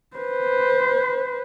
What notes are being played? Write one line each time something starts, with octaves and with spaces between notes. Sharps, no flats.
B4 C5